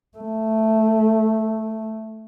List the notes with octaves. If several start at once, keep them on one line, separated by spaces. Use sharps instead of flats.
A3